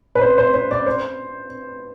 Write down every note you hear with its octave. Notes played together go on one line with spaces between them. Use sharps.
B4
C5
C5
C5
D5
C5